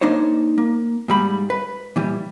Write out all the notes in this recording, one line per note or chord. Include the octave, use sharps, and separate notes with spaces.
A#3 D4 D#4 C5 C#5
A#3
G#2 G3 B5
B4
A#2 E3 G3